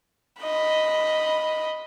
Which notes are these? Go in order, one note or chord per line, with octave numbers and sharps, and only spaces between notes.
D#5 B5